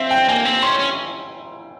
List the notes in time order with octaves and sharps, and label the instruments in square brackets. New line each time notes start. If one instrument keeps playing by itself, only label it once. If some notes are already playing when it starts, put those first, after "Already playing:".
Already playing: [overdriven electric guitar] C4 [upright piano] E5 F5
[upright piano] G5
[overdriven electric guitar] A#3 [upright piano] G#5
[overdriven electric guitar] C4
[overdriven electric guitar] C#4 [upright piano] C6
[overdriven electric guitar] C#4